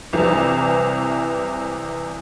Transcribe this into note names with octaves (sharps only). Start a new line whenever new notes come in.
C2 C3 E3